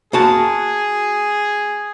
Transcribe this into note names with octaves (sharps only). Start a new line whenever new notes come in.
A#3 F#4 G#4 A5